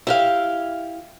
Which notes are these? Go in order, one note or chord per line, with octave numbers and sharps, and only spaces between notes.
E4 G4 F5